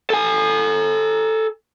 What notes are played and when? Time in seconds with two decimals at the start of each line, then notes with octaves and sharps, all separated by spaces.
0.10 A4 G#5